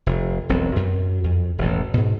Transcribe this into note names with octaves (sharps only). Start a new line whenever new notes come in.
F1
E1 B1 C4
F#2
F2
E1 A1
G#2 B2